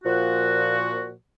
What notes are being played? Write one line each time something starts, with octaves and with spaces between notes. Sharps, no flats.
A#2 F3 F#4